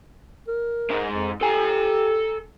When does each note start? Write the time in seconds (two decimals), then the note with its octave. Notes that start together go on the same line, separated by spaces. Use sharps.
0.48 A#4
0.90 G#2 G#3
1.12 F2
1.41 G4 A4 G#5